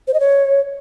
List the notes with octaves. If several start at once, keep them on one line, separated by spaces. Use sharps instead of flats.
C5
D#5
C#5